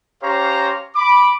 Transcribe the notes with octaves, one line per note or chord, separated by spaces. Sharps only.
C#4 G4 C5 C#5 F5 A#5
B5 D6